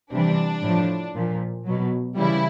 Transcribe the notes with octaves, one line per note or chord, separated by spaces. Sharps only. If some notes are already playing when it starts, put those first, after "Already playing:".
C3 E3 G3 D4
A2 F3
A#2 F3
B2 F#3
C#3 E3 G3 E4